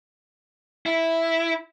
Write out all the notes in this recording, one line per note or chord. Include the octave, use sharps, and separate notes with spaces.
E4